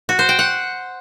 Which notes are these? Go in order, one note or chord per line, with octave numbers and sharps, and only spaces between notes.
F#4
C5
G5
F#5